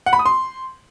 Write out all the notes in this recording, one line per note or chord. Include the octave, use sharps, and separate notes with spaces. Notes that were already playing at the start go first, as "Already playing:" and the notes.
F#5
B5
D#6
C6